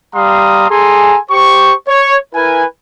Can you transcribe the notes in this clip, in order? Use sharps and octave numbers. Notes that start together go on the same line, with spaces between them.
G3 F5 A#5 C6 D#6
G#4 A4 G#5 A#5 C6
G4 C5 C#6
C#5
E4 A#4 B4 G#5